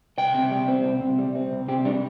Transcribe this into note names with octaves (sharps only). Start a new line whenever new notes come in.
C2 G5
C3
G3
C4
C2
C3
G3
C4
C2
C3 G4
G3 D4